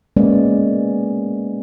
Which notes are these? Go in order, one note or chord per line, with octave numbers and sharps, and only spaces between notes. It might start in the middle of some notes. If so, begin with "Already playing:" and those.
G#3 A#3 B3 C#4 D5